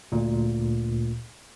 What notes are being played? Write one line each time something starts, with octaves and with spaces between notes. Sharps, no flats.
D2 A#2